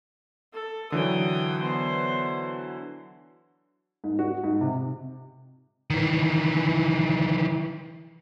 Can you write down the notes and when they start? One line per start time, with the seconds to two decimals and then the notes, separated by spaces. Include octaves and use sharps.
0.54 A4
0.92 D3 E3 F#3 G5 D#6
1.62 B3 C5
4.04 G#2
4.19 F#4
4.44 G#2
4.61 C3
5.90 D#3 E3